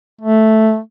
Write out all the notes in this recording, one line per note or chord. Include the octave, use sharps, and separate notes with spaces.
A3